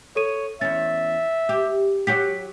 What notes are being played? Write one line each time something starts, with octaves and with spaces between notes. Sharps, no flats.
A4 C#5 D#7
E2 C#4 E5 A6
G4
F#3 F#4 G4 B6